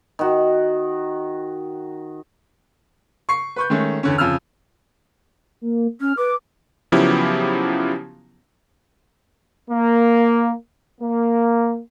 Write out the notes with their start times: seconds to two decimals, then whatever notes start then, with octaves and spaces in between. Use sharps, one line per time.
0.19 D#3 F#4
3.29 C#6 C7
3.56 B4 C#6 G6
3.70 D#3 G#3 A3 C#4
4.03 E2 D3 C#4
4.18 F2 C#3 E6 F6
5.62 A#3
6.01 C#4 F6
6.18 B4 D6
6.92 C#3 F3 F#3 B3 E4 G4
9.70 A#3
11.01 A#3